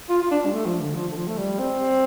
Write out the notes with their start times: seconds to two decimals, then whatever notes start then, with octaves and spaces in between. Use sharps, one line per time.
0.10 F4
0.22 F4
0.31 D4
0.46 G3
0.53 A3
0.66 F3
0.80 D3
0.95 F3
1.11 D3
1.17 F3
1.28 A3
1.38 G3
1.59 C4